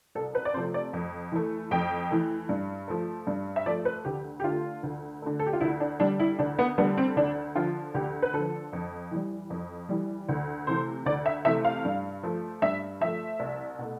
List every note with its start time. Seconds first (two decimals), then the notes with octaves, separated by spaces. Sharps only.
0.15 C2 A4
0.35 B4
0.45 D5
0.54 C3 F3 A3 C5
0.74 D5
0.93 F2
1.32 E3 A3
1.71 F2 G5
2.10 E3 A3
2.49 G2
2.88 F3 A3
3.27 G2
3.56 E5
3.66 F3 A3 D5
3.85 B4
4.05 D2 G4
4.40 G4
4.44 D3 A3 F4
4.83 D2
5.22 D3 A3
5.39 A4
5.46 G4
5.53 F4
5.61 D2 E4
5.80 D4
6.00 D3 G3 D4
6.19 E4
6.39 D2 D4
6.59 B3
6.78 D3 G3 B3
6.97 C4
7.16 D2 D4
7.55 D3 F3 F4
7.94 D2 G4
8.22 B4
8.34 D3 F3 A4
8.73 F2
9.11 E3 G3
9.50 F2
9.89 E3 G3
10.29 D2
10.67 C3 E3 A3 C5
11.06 D2 D5
11.26 E5
11.45 C3 E3 A3 E5
11.65 F5
11.85 G2
12.23 F3 A3
12.62 G2 E5
13.01 F3 A3 E5
13.39 C2
13.79 B2 A3